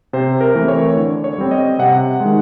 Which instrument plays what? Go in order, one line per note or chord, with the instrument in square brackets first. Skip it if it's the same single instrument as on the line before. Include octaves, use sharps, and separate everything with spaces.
[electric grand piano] C3 C5
A#4
E3 A3 C4
C#5
D3
C#5
G3 C4
D#5
C3 F#5
D#3 G#3